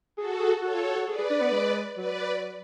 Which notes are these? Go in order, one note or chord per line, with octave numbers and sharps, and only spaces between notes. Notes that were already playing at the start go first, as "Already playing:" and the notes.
F#4 G#4 A4
G#4
F#4 A4 C#5
F4
F#4
F#4
G#4 B4 D5
G#4
D4
B3
G#3
F#3 B4 D5